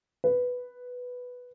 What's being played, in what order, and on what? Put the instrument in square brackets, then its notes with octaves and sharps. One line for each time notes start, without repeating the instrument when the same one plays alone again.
[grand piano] B4